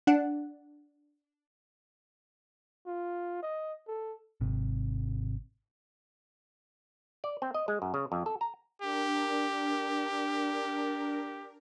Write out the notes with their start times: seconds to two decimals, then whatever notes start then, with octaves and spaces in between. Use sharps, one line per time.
0.07 D4 F#5
2.86 F4
3.42 D#5
3.87 A4
4.41 G#1 C3
7.24 D5
7.42 C4
7.54 D#5
7.68 G#3
7.82 F#2
7.94 C#3
8.12 F2
8.26 A4
8.41 A#5
8.82 D4 G4 A#4